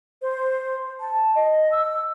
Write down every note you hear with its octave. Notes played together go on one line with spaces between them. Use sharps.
C5
A5
D#5
E6